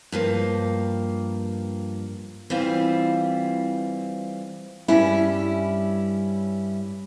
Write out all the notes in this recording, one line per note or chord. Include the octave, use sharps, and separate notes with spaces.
G2 F3 A#3
E3 G3 C4 F4
G2 G3 C#4 E4